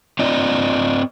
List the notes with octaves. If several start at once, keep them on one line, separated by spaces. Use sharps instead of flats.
C4 F4 D5 D#5